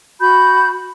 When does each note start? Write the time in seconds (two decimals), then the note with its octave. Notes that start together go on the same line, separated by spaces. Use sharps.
0.21 F#4 B5 G6